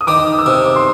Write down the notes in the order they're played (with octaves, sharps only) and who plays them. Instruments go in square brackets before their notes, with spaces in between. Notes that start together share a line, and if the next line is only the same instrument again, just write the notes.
[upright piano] D#6
[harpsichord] D#3 [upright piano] D6
[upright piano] D#6
E6
[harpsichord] C3 [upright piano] D#6
[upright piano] D6
C6